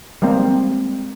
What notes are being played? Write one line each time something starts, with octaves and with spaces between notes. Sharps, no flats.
G3 G#3 A#3 C4